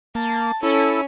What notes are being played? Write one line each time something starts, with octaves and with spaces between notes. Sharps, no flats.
A#3 A5
C#4 E4 A4